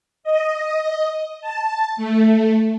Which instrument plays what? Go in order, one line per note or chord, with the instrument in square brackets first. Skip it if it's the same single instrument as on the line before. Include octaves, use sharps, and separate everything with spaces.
[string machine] D#5
A5
A3